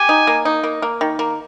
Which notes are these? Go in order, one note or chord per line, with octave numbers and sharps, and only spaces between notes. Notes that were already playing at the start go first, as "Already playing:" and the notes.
Already playing: G4 G#5
D#4
A#3
D#4
A#3
A#3
D#3
A#3